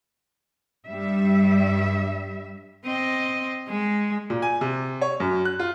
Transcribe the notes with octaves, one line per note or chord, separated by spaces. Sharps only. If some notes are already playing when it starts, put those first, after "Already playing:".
G2 G3 E5
C4 D#5
G#3
A#2
G#5
C3
C#5
F#2
F#6
F4